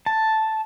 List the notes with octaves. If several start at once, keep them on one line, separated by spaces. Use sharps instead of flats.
A5